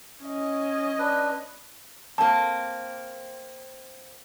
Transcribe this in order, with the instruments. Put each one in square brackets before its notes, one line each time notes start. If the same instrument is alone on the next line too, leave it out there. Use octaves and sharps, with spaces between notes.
[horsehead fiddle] C#4 D#5
[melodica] D4 B4
[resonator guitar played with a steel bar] A#3 C4 [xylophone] A5